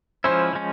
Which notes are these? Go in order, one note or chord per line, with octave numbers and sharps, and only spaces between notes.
F3 G#3 C#4 E4 C5
F3 G#3 C#4